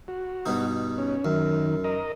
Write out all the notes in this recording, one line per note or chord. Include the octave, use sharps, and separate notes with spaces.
F#4
G2 B2 D#4
C#4
F#2 D#3
A#4 D#5